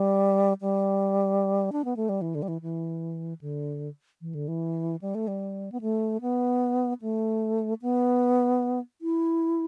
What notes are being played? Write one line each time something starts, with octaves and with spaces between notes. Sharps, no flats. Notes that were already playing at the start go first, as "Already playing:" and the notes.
Already playing: G3
G3
D4
B3
A3
G3
E3
D3
G3
E3
E3
D3
E3
D3
E3
G3
A3
G3
B3
A3
B3
A3
B3
E4